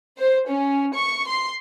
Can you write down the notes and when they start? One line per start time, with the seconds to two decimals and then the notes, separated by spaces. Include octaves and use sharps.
0.18 C5
0.50 C#4
0.96 C#6
1.28 C6